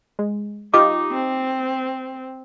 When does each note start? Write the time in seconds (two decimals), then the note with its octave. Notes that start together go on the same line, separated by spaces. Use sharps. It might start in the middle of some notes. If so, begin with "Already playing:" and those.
0.19 G#3
0.74 D#4 F4 G4 D#5 D6
1.12 C4